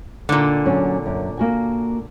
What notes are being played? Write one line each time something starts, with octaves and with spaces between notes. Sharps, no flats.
A#2 D3 D#4
F#3 C#4
F#2
A#3 F#4 G#5